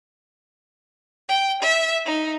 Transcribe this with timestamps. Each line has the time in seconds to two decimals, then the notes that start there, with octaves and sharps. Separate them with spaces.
1.27 G5
1.60 E5
2.04 D#4